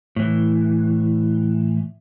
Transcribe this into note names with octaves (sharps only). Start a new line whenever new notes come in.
A2 E3